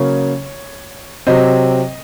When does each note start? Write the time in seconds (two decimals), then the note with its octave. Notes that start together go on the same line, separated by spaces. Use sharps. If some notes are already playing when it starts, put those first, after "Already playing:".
Already playing: C#3 F#3 A#3 C#4 C#5
1.27 C3 F#3 C4 D#5